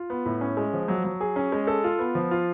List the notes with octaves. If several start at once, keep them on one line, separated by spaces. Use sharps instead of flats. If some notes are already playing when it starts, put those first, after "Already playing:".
Already playing: F4
B3
A2
C#4
G#3
F3
F#3
F#3
G#4
C#4
G#3
A4
F4
B3
F3
F4